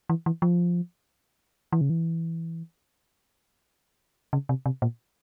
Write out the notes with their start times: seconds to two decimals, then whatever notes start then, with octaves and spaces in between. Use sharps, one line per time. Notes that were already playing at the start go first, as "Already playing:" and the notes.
0.10 E3
0.26 E3
0.42 F3
1.73 E3
1.81 C#3
1.90 E3
4.33 C#3
4.49 C3
4.66 C3
4.82 A#2